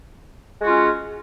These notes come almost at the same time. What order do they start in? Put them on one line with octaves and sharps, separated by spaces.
G#3 F#4 F4 C#4